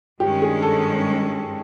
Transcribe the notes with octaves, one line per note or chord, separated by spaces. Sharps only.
G2 D#3 G#3 C#4 G4
G#4
A4